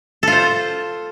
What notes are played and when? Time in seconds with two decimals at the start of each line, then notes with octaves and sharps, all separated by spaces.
0.23 A4
0.27 F4
0.32 C5